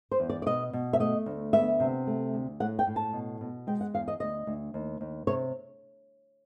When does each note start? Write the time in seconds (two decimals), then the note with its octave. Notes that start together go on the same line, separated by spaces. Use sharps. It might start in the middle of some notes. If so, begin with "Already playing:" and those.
0.11 C5
0.20 E2
0.30 D5
0.42 D5
0.46 B2 D#5
0.73 B2
0.93 E5
1.00 A3 D#5
1.26 D2
1.53 B3 E5
1.80 C3
2.07 A3
2.34 D2
2.60 A2 F#5
2.79 G5
2.87 A2
2.96 A5
3.13 B2
3.41 B2
3.67 G#3 G5
3.81 F#5
3.94 E2 F5
4.08 D#5
4.20 D2 D#5
4.47 D2
4.74 D#2
5.01 D#2
5.27 C3 C#5